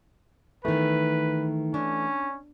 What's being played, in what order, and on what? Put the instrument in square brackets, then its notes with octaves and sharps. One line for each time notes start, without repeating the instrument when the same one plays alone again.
[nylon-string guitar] D#3 B3 [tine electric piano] E3 A3 [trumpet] B4
[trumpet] C#4 [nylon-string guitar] D4